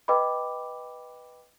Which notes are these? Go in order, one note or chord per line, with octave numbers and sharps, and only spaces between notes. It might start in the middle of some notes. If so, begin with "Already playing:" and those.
B4 D#5 G5 B5 D6